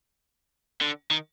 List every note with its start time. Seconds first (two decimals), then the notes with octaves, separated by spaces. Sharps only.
0.81 D3
1.11 D#3